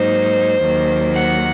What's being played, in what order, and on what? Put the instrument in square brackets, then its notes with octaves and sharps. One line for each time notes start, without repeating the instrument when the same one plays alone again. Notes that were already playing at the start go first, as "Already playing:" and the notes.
Already playing: [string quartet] G#2 F#3 A#3 D#4 C5
D#2 D#3 F#3 A#3
F#5